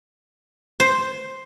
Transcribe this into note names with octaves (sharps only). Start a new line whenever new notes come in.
C5